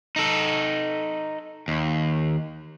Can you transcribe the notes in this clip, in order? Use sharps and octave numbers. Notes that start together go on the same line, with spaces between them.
D#4 A4
D#2